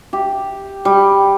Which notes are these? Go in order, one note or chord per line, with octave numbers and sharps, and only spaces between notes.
G4
G3